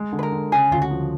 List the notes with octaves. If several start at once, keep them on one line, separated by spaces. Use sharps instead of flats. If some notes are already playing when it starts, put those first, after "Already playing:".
Already playing: G#3
D3
B4
A#4
D3
C#3 G#4
D2 F4
F#4
F3